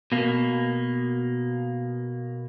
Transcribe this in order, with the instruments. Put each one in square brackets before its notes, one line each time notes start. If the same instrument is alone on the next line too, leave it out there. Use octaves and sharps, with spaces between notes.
[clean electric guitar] B2 A#3